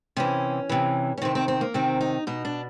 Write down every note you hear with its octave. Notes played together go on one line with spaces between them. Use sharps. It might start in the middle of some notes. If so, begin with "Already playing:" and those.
C3 E3 C#4
C3 E3
C#4
C3 D#3 C4
C4
C4
A#3
C3 D#3 C4
D#4
B2 D#4
D4